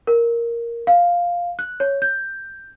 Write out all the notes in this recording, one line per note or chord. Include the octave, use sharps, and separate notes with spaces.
A#4
F5
F#6
C#5
G6